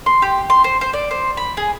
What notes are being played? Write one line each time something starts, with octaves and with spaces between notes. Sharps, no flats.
C6
G4
C6
C5
C5
D5
C5
B5
G#4